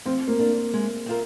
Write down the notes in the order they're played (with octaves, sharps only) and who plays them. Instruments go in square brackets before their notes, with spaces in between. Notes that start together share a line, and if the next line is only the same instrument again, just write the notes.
[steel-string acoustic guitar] F3 [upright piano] C4
[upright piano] A#3
[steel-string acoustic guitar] A#3 D4
G#3
C4 F4 A#4